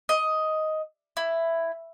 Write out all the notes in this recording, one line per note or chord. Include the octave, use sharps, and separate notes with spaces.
D#5
E4